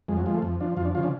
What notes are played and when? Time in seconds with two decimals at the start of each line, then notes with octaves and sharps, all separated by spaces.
0.08 F2 G#3
0.17 F#3
0.26 F3 G#3
0.34 A3
0.42 F2
0.60 F3 D4
0.77 F2 F4
0.85 D4
0.95 C#3 F3 F4
1.03 D4